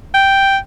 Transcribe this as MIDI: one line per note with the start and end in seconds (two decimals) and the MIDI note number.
0.14 0.57 79